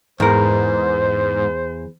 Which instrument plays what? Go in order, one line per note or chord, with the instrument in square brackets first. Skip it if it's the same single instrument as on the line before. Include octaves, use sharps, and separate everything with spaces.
[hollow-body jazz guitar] E2 A#4 [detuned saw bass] G#2 [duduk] C5